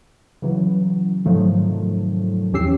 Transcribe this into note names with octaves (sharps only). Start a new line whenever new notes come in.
C#3 E3 F#3
G#2 C3 D#3 F3 F#3 A3
E2 E3 C#4 G4 E6 C7